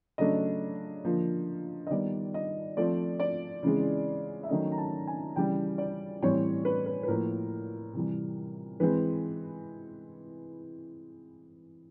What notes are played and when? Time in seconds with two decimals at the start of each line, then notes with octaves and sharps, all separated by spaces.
0.18 C#3 F#3 A3 D4 D#5
1.05 D3 F3 A#3
1.87 D#5
1.90 D#3 G3 B3 D5
2.34 D#5
2.77 F3 A3 C4 D5
3.20 D5
3.63 C#3 E3 G#3 C4
4.43 E5
4.49 D#3 F#3 A3 C#4 D#5
4.72 A#5
4.78 A5
5.07 G#5
5.36 C#3 E3 G3 G5
5.78 D5
6.22 A2 E3 G3 C4 C#5
6.65 B4
6.86 B4
7.03 B4
7.08 A2 F3 A#3 A#4
7.94 C3 E3 G3
8.80 E3 G#3 C4 B4